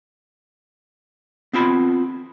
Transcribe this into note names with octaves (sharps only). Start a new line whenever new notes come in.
B3 C4 F4 B5